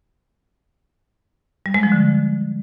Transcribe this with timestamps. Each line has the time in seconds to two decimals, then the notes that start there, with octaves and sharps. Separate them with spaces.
1.66 G3
1.74 G#3
1.83 F3
1.92 D3